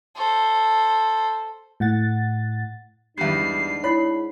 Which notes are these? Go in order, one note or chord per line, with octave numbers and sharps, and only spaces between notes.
A4 C5
A2 F#5 A6
E2 G#2 G3 D4 C7
E4 C#5 B5